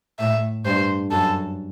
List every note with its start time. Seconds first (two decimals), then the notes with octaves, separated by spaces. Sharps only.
0.19 A2 E5
0.65 G2 C5
1.11 F#2 A4